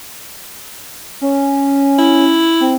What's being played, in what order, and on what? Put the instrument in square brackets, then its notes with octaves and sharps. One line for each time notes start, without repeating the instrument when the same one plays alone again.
[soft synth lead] C#4
[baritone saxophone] E4
[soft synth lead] C4